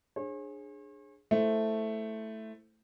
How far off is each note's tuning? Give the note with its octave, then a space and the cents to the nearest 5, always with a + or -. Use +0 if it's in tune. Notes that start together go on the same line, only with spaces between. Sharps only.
D4 +15 G#4 +0 C#5 -45
A3 +0 E4 +0 C5 +0